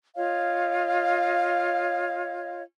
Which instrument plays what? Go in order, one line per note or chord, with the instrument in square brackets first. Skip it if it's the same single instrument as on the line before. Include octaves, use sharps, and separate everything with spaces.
[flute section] F4 C#5 D#5 F5